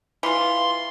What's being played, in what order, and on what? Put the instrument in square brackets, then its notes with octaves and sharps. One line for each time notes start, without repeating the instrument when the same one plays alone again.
[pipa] E3 F4 [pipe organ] C6